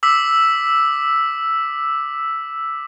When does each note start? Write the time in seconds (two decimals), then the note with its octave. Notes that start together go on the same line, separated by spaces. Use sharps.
0.03 D6 E6 B6